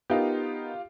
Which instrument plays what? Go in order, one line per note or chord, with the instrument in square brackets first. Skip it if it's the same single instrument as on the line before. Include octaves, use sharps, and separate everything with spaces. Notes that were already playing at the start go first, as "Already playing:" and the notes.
[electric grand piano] B3 D#4 A#4 [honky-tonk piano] F4 G4